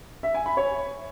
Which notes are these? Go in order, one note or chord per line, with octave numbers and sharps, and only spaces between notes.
E5
G#5
B5
C#5